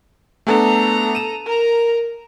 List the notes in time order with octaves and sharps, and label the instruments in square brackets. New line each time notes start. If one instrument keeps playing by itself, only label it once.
[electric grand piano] A3 B3 D4 [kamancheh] A4 A#5
[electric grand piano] D#7 E7
[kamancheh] A#4 A#5